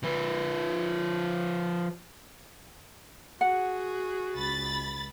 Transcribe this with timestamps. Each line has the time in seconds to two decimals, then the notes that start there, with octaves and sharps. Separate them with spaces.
0.04 F3 B4
3.41 F#4 G#4 F#5
4.34 C#2 B5 A6